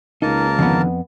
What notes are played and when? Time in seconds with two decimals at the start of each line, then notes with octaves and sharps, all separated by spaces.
0.22 C#2 A#3 D#4 A#4 A5
0.59 F2 D3 D#3 F3 B3